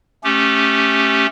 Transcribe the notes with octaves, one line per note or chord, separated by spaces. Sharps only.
A3 C#4 G4